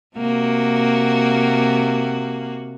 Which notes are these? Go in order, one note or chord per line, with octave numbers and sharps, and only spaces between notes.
C3 A#3 F#4